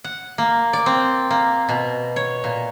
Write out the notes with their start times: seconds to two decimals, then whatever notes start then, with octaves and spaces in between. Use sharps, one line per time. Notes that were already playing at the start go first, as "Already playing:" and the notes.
0.04 F#5
0.38 A#3
0.73 D5
0.86 C4
1.31 A#3
1.69 B2
2.16 C#5
2.44 A#2